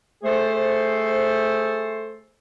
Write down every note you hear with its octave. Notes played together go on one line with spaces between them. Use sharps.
A3 G#4 A4 C5